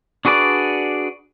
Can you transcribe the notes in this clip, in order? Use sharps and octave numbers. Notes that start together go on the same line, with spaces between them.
D4 F#4 G#4 B4 D5